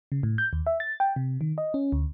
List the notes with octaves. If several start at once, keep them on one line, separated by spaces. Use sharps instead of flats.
C#3
A2
G6
D#2
E5
A6
G5
C3
D#3
D#5
C#4
D2